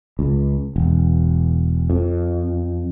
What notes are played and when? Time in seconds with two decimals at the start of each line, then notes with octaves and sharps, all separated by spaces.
0.19 C#2
0.76 E1
1.90 F2